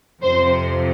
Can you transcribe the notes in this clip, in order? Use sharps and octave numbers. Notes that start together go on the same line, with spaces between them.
F2 C3 F3 C5